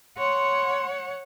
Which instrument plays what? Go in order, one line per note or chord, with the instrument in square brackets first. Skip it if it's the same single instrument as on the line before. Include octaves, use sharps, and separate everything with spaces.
[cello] C#5 F#5 [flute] C6